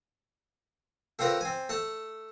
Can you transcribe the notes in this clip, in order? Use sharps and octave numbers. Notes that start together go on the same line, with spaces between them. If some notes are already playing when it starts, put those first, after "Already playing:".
A3 C4 F4 A#4 B4 D5
C4 G#5
A3 A5